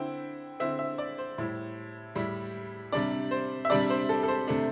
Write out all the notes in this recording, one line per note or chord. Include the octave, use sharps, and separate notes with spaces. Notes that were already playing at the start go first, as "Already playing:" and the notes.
Already playing: D3 C4 E4 G5
D3 C4 E4 E5
E5
D5
C5
A2 G3 E4
A2 G3 E4
C3 G3 D4 D5
C5
E5
C3 G3 D4 D5
C5
A4
A4
C5
C3 A3 D4